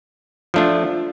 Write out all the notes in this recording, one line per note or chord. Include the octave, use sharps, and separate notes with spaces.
F3 A3 D4 F4